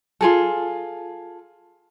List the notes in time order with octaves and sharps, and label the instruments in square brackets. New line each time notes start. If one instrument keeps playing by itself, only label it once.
[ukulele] F4 G#4 A4